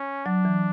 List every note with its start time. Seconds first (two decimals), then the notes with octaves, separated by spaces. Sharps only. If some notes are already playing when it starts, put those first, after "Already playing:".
Already playing: C#4
0.25 F#3 D4
0.45 E3